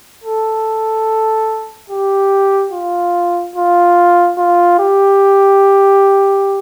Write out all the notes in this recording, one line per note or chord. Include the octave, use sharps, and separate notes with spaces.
A4
G4
F4
F4
F4
G4